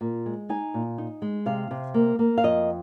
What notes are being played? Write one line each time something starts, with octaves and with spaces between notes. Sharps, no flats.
A#2
G#3
D#4 G#5
A#2
D#4
G#3
C3 F5
C3
A#3
A#3
F5
F2 D#5